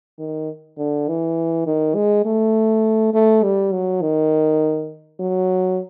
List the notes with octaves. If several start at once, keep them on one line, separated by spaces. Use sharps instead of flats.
D#3
D3
E3
D#3
G#3
A3
A3
G3
F#3
D#3
F#3